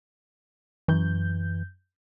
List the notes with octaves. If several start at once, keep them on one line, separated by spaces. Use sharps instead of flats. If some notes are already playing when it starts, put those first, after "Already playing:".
F#2 E3 G6